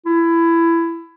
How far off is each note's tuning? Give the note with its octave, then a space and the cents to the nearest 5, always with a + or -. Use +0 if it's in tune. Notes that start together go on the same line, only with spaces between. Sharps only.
E4 +20